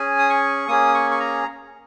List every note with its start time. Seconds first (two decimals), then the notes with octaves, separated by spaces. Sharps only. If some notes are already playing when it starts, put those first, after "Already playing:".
Already playing: C#4 G#4 G#5
0.19 D#6
0.30 C#6
0.68 A#3 C#4 G#4 D#6
0.94 C#6
1.11 C#6
1.20 A#5